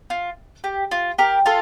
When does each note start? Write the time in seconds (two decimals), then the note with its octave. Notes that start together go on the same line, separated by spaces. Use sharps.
0.10 F4
0.64 G4
0.91 F4
1.18 G4 A#4
1.46 F4 A4